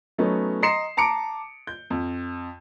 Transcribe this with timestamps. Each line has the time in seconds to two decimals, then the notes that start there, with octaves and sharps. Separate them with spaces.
0.18 F#3 A3 B3 C#4 D#4
0.63 D#5 A#5 C6 C7 C#7 E7
0.97 A5 A#5 D6 C#7 D7
1.67 G6
1.90 F2